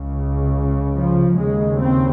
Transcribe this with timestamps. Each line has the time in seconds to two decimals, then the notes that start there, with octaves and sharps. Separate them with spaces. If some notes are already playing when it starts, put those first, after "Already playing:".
Already playing: C#2 C#3
0.95 F3
1.37 D#2 C#3 G#3
1.80 C4